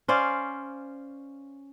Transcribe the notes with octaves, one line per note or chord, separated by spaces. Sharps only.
C#4 C5 D5 F5